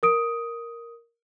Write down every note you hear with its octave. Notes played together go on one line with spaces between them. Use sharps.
A#4 D#6 D7